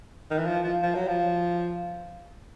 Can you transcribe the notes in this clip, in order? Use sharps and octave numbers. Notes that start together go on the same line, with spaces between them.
D#3
E3
F3
F3
F3
F#3
F3